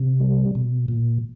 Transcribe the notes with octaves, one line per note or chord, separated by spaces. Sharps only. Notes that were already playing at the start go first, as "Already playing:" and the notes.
Already playing: C3
G3
B2
A#2